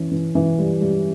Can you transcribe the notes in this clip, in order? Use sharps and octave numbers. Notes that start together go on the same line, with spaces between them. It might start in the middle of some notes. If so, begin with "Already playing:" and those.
Already playing: E3 C#4
E3
E3
G3
G3